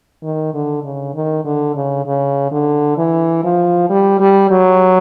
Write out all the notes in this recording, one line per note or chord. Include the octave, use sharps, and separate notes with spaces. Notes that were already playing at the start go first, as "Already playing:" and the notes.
D#3
D3
C#3
D#3
D3
C#3
C#3
D3
E3
F3
G3
G3
F#3